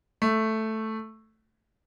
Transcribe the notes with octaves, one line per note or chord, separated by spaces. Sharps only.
A3